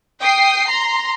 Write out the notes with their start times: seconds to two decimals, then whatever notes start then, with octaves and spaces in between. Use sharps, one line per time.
0.20 G5 D#6 C7
0.68 A#5 C6